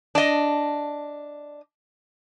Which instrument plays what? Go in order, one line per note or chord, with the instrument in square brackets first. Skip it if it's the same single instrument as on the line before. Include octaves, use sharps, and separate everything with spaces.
[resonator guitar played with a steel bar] D4 D#5